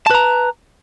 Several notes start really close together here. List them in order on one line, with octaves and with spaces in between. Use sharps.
A5 B4 A#5